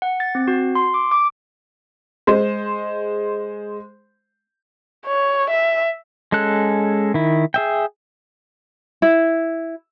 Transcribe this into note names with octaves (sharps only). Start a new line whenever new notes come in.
F#5
A6
C4
F#4
C6
D6
D6
G#3 C5
C#5
E5
G#3 C#4 A4 F#6
D#3 E4
G#4 E5 G5
E4